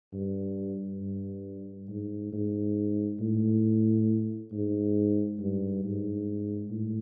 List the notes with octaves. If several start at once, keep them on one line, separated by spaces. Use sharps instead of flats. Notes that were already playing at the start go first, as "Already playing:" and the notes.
G2
G2
G#2
G#2
A2
G#2
G2
G#2
A2